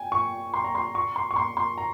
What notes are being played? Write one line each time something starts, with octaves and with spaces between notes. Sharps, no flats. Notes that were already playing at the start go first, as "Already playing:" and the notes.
Already playing: G5 G#5
C#6
C6
A#5
C6
C#6
C6
C#6
C6
C6
A#5